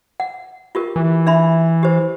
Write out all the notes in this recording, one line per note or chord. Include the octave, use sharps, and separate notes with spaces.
F#5
F4 G4 A#4
E3
D4 E5 B5
G4 C5